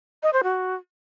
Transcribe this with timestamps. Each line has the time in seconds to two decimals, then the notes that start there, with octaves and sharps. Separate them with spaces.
0.23 D#5
0.33 C5
0.43 F#4